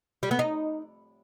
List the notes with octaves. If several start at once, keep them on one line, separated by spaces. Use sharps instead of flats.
G3
B3
D#4